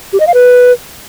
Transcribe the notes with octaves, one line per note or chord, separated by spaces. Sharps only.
G4
D#5
F5
B4